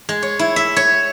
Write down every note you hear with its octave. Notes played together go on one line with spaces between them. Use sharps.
G#3
C#5
E4
E5
C#5